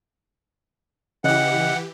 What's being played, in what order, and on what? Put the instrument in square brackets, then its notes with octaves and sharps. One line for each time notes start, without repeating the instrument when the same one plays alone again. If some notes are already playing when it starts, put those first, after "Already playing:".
[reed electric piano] C#3 D#5 F#6 [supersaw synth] E3 G4 [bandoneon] F#5